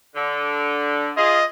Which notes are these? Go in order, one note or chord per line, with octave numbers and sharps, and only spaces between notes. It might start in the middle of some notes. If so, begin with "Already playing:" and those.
D3
F4 G#4 D#5